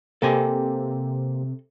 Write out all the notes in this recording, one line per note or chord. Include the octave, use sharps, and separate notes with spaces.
C3 A#3 C4 G4 A4 D#5 G#5